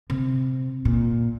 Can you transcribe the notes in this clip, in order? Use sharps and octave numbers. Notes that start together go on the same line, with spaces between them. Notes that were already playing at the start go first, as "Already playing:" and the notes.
C3
A#2